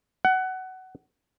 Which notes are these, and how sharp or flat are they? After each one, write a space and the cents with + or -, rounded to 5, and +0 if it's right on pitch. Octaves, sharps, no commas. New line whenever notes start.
F#5 +20